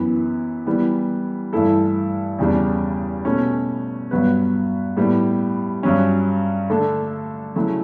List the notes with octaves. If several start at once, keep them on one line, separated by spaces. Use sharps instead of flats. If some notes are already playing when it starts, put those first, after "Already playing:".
Already playing: F#2 E3 B3
E3 G3 B3
G2 E3 A3 E4 A4
E2 C#3 G3 D4
B2 A3 C#4
G2 F#3 B3 F#4 B4
A2 G3 B3
G2 F#3 C#4
D3 A3 D4 A4
C#3 F#3 A3 E4